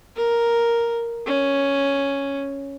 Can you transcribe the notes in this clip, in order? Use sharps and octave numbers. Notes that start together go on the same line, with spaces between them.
A#4
C#4